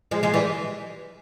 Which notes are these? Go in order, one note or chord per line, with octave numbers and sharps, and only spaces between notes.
F3 G#3
F3 G#3
E3 G3